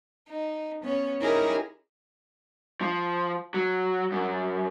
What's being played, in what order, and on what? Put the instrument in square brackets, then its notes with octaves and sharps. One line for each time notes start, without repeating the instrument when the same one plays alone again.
[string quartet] D#4
B3 C#4 C#5
C#4 D#4 E4 G4 G#4 A#4
[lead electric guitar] F3
F#3
F#2